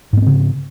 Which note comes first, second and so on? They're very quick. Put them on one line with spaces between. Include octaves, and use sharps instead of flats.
G#2 B3 C4 C#3